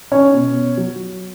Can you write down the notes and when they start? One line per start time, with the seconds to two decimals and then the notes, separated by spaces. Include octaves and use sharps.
0.12 C#4 C#5
0.34 B2
0.77 F#3